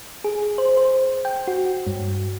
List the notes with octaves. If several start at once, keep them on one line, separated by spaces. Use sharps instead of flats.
G#4
C5
C5
G5
F#4
G2